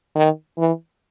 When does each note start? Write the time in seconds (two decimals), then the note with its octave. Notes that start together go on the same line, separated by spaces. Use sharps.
0.15 D#3
0.58 E3